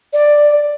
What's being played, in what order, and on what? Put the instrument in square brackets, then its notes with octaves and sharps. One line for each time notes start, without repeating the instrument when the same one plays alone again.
[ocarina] D5